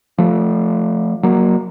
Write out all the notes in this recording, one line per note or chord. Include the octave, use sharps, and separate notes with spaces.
F3 A3
F#3 A#3